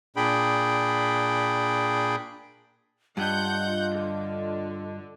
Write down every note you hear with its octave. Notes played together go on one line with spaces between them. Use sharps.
A#2 D4 G#4 G5 B5
G2 D4 F4 D#5 F#5 G6
D3